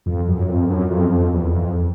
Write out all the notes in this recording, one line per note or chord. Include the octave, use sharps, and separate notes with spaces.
F2
F#2
F2
F#2
F2
F2
E2
F2